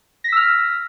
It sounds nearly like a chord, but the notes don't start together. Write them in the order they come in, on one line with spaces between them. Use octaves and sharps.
A#6 B6 E6 F6